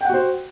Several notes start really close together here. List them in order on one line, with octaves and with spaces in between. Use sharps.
G5 F#5 F#4 C5